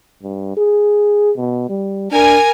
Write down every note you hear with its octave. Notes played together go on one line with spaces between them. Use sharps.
G2
G#4
B2
G3
D4 A#4 G#5